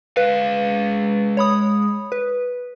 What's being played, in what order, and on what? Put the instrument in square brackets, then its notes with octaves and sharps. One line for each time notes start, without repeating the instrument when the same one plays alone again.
[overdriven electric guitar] G#3 F5 [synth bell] B4
[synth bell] C#5 B5 D#6
B4